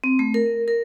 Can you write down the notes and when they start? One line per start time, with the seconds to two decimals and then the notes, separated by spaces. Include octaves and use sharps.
0.04 C4
0.19 A3
0.34 A#4
0.68 A#4